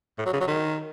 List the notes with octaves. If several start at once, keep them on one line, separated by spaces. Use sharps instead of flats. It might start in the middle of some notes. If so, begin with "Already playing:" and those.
A2
F#3
C#3
F#3
D#3